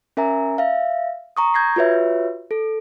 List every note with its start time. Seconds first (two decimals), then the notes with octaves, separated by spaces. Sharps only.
0.17 C#4 A#4 E5 G#5 A#5
0.58 E5 F5
1.37 A#5 C#6 D#6
1.54 G6 G#6 A#6 C7
1.76 F4 F#4 B4 C#5 E5
2.51 A4